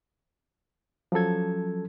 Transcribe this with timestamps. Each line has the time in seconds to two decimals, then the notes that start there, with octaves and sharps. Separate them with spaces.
1.12 F3 F#3 C#4 A4 G#6